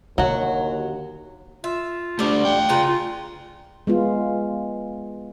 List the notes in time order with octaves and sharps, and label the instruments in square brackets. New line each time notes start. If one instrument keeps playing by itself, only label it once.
[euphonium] D#2 [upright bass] D3 [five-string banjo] F#3 F#4
[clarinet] F4 [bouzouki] E5
[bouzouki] G3 D5 [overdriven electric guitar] A3 D4
[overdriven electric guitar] F5 G5
[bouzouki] C#3 B4 A#5 [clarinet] F4
[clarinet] F4
[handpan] G#3 B3 F4